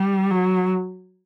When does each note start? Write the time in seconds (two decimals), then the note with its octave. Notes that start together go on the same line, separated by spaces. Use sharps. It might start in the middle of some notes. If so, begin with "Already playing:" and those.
Already playing: G3
0.31 F#3